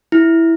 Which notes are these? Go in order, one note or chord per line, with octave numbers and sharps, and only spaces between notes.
E4